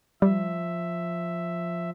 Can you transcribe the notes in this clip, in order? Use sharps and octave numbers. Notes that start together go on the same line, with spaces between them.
F3 G3 E5